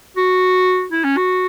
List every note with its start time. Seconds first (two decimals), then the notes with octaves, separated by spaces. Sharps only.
0.17 F#4
0.92 E4
1.04 C#4
1.17 F#4